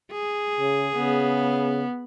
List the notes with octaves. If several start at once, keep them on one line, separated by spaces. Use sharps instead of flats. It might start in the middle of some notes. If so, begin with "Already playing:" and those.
G#4
C#3
C#3 B3